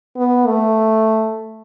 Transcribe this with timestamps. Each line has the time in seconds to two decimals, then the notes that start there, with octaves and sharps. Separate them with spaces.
0.17 B3
0.47 A3